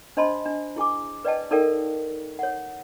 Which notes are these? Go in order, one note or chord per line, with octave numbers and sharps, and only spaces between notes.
D4 C5 D#5 A5 B5 C6
D4
E4 G#4 G#5 D6
B4 D5 D#5 G5 A5
D#4 A4 A#4 D5 F5 G5
C#5 F#5